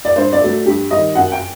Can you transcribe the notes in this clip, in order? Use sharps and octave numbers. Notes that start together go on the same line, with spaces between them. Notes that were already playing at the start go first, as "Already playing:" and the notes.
D5
G2 C5
D5
F#3 A3
G2 G4
D#3 G3 D#5
F#2 F#5
G5